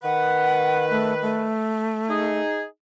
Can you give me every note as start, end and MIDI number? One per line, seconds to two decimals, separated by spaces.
0.03 1.58 51
0.03 1.58 71
0.03 0.85 78
0.90 1.14 57
1.22 2.39 57
2.10 2.63 63
2.10 2.63 68